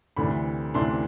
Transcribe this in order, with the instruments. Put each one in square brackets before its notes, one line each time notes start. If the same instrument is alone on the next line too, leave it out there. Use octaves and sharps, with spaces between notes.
[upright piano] D2 C3 E3 A3 D4 B5
D2 C3 E3 A3 D4 C6